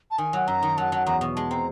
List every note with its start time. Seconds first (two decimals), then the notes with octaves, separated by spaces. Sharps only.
0.11 A5
0.18 D#3 G#5
0.33 F#3
0.48 F#2 A#5
0.62 D#3
0.77 F#3 A5
0.92 F#3
1.06 E2 A#5
1.21 B2
1.36 G#3 A5
1.51 C4 A#5